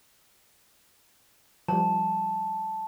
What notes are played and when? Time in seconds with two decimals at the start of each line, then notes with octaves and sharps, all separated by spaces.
1.68 F3 G3 A5